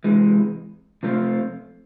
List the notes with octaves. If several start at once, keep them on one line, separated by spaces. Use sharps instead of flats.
C3 E3 G#3
C3 F3 A3 C4 F4